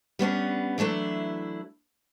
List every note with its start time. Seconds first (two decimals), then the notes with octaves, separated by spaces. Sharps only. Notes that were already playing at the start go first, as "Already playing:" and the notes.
0.19 G3 B3 C#4 D4
0.78 E3 F#3 A3 D4 E4